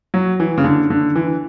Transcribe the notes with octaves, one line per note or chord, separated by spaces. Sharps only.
F#3
E3
C#3
D3
D3
E3